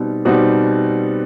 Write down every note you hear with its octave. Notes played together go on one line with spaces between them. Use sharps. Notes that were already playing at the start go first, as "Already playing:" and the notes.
Already playing: B2 G3 C4 D#4
B2 G3 C4 D#4 F#4